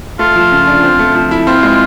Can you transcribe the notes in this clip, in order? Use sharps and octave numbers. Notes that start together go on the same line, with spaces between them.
A3 F4
F3
C#3
D4
C4
A3
F3
E4
C4 F4
G#3